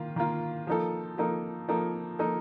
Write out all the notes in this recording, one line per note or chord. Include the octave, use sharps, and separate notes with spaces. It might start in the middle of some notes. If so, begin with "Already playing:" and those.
Already playing: D#3 A#3 F4
D#3 A#3 F4
F3 A#3 D#4 A4
F3 A#3 D#4 A4
F3 A#3 D#4 A4
F3 A#3 D#4 A4